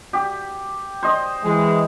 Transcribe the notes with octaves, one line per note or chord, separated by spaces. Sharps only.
G4
C5 D#5
E3 G#3